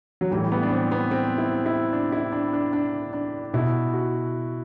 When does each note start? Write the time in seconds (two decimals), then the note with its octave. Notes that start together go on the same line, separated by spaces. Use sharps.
0.21 F#3
0.31 A2 E3 G3
0.52 B3
0.63 D4
0.71 C4
0.92 B3
1.11 C4
1.38 E4
1.66 E4
1.93 D4
2.12 E4
2.32 D4
2.53 D4
2.73 D4
3.13 D4
3.53 B2 E4
3.93 F#4